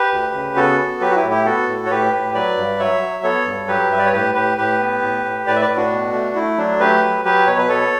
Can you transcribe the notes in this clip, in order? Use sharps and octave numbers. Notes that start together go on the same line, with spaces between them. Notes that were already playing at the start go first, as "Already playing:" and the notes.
Already playing: G4 B4
D2
C#3
B3 F#4 A4
B3
F#3 G4 B4
F#4
E4 G4
A2
E4 G4
B3 F#4 A4
A2
C#5
A2 G4 B4
A2
F#3 B4 D5
G2
F#3 C#5 E5
F#3
B3 A4 C#5
G2
F#3 G4 B4
G2 E5
D5
C#5
A2 G4 B4
A2 G4 B4
A2 G4 B4
B3
A2
A2
A2 B4 D5
E5
B4 D5
A2
D4 F#4
B2
A3
A3 E4
F#3 D4
A3 G4 B4
F#3
F#3 G4 B4
B2 C#5
B4
B3 A4 C#5